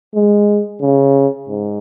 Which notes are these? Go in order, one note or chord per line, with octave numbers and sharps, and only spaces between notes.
G#3
C#3
G#2